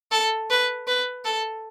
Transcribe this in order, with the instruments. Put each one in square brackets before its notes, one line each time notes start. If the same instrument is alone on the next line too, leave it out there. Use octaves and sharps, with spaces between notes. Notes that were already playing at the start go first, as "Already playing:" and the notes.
[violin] A4
B4
B4
A4